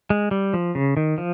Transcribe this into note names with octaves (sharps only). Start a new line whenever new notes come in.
G#3
G3
F3
C#3
D#3
F3